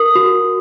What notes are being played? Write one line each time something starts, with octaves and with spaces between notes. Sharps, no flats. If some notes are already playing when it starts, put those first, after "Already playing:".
Already playing: A#4 D#6
F#4